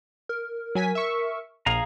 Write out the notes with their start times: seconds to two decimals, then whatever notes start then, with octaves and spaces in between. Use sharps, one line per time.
0.29 A#4
0.75 F#3 G#5 B6
0.95 E5 C#6
1.66 A#1 G#4 F5 A#5